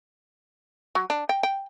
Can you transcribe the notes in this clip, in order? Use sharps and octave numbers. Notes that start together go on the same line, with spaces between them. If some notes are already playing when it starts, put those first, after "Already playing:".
F#3
D4
G5
G5